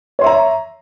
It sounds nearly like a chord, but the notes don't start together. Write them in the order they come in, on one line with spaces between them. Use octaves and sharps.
C#5 C6 E5 A#5